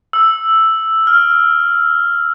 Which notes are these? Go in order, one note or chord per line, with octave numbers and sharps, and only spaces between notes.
E6
F6